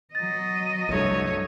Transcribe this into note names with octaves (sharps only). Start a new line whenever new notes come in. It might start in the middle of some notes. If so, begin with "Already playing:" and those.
F#3 D#5 A6
C2 G2 A3 C#5